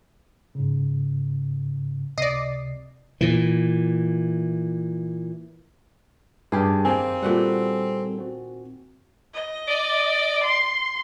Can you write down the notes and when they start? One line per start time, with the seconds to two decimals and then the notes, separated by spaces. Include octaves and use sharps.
0.55 G#2 C#3
2.18 C#2 C3 D5 D#5 C7
3.21 A#2 E3
6.52 G2 C#4 G4 G#4
6.85 F#2 D#3 A#3 C4 G#5
7.23 A#2 G3 F#4 A4 B4 F#5
8.19 C4 F#4
9.34 D#5
9.68 D5
10.44 C6